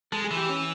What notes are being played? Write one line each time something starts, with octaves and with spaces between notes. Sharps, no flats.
G#3 A4
G#4
E3
G4
C#4